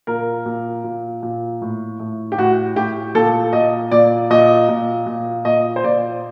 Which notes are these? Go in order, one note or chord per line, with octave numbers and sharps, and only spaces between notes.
A#2 A#4
A#2
A#2
A#2
A2
A2
G4
A2 F#4
A2 G4
A#2 A4
A#2 D#5
A#2 D5
A#2 D#5
A#2
A#2
A#2 D#5
C5
A#2 D5